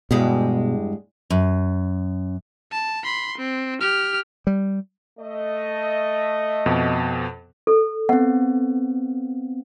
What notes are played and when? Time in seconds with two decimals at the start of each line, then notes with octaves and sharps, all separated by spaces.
0.11 E2 G2 B2 G#3
1.30 F#2
2.72 A5
3.04 B5 C6
3.38 C4
3.81 G4 F6
4.47 G3
5.20 A3 D#5
6.66 F2 B2
7.67 A4
8.09 B3 C4 F#5